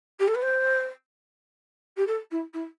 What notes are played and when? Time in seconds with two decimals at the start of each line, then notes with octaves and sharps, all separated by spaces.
0.19 G4
0.28 A4
0.34 B4
0.42 C5
1.97 G4
2.07 A4
2.31 E4
2.53 E4